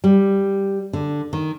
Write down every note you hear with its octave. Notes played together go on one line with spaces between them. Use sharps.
G3
D3
D#3